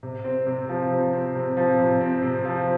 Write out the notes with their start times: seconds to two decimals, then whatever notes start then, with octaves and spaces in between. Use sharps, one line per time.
0.03 C3
0.24 C4
0.47 C3
0.69 F3
0.91 C3
1.13 C4
1.35 C3
1.57 F3
1.79 C3
2.01 C4
2.22 C3
2.45 F3